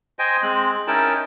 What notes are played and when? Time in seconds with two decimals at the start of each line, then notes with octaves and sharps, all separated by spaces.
0.19 C5 D#5 G5 G#5
0.43 G#3 C4 F#6
0.88 C#4 D#4 E4 A#4 G5 A5